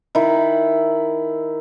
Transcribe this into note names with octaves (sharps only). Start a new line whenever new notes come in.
D#3 E4